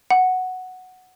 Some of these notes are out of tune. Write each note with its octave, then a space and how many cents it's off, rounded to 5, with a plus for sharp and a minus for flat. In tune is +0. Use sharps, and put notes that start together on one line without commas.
F#5 +0